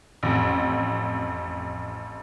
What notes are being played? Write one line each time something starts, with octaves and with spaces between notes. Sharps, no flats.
A1 F2